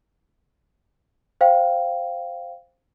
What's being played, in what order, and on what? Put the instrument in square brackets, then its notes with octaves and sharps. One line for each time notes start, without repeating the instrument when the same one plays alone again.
[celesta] C5 F5 G5